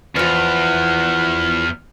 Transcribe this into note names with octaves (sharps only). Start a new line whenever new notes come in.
E2 E3 F3 F#5 F6